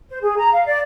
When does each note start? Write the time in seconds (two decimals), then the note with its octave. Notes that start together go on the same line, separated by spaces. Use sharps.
0.09 C5
0.22 G#4
0.37 A#5
0.52 F5
0.66 D5